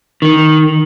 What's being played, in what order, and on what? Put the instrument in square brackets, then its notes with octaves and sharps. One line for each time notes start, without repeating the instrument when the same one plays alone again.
[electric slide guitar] D#3